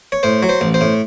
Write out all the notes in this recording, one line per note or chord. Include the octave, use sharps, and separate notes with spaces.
C#5
A2 C5
F#3
C5
A1
C5
A2